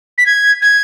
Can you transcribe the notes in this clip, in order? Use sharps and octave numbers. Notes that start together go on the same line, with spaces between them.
B6
G#6
G#6